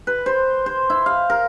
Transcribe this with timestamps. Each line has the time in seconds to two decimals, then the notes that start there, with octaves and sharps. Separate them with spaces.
0.07 B4
0.26 C5
0.66 C5
0.90 E4
1.06 F5
1.30 A#4